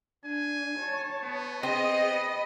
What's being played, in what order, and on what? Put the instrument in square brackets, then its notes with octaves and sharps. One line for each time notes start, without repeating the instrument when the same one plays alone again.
[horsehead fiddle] D4 [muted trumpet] G#5
[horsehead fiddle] C#5 A5
[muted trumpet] B3
[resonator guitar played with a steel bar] C4 [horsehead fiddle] G#4 [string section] D#5
[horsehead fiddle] B5